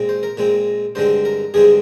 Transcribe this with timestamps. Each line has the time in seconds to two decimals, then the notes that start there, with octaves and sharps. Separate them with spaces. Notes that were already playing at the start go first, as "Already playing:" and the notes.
Already playing: A#2 G#3 C4
0.09 C5
0.23 A#4
0.37 A#2 G#3 C4
0.95 G2 D3 G#3 C4 C5
1.25 A#4
1.54 G2 D3 G#3 C4 G#4